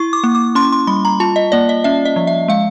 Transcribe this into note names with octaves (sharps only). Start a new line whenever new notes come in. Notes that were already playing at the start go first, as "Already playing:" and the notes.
Already playing: E4 C#6
D6
A#3
D6
C#4 C6
C6
G3 B5
A#5
F4 A5
D#5
A#3 D5
D#5
C#4 E5
D#5
F3
E5
G#3 F5